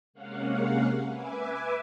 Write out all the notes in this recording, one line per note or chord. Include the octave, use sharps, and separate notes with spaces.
C3 G#3 A#3 C#4 F5 F#5
B4 E5 G#5 D6